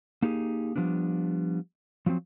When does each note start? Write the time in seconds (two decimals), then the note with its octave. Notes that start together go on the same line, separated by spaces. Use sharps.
0.22 A#3 D#4 G4 G#4
0.76 F3 G3 B3 D4
2.06 F3 F#3 B3 C4